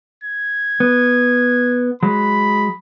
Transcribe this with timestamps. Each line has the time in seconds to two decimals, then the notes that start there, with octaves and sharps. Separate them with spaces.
0.23 G#6
0.80 B3
2.03 F#3 G#3 B5